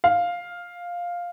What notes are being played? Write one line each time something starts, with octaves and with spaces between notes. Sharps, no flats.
F5